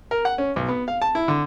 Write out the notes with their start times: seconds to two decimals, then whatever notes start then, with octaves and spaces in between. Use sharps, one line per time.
0.11 A#4
0.25 F#5
0.38 C#4
0.56 B1
0.69 B3
0.88 F5
1.02 A5
1.15 E4
1.28 D3